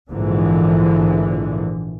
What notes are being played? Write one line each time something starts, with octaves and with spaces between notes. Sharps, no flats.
A#1 G#2 D3 E3